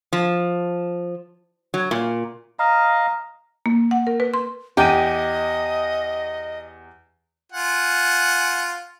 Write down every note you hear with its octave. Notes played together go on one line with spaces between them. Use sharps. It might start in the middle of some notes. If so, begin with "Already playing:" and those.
F3
F#3
A#2
D#5 F5 A#5
A#3
F#5
A#4
B4
C6
E2 G4 D#5 D#7
F4 F#5 G#5